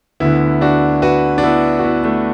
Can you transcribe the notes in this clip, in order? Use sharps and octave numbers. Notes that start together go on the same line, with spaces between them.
D2 D3 B3 E4
D4 F#4
F#4 B4
D4
B3 E4
F#4
B3 E4
A3 D4